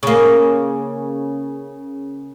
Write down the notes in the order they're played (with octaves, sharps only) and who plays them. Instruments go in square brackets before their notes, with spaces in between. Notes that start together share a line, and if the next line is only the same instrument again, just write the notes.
[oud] C#3 A#3